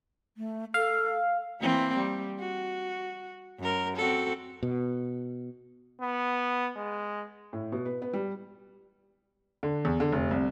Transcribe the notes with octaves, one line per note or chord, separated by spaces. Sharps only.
A3
A4 F5
E3 A#3 C4
G3
F#4
F#2 A#4
C4 F#4 A4
B2
B3
G#3
A2
B2
B4
B3
G3
D3
E2
D3
F1
C2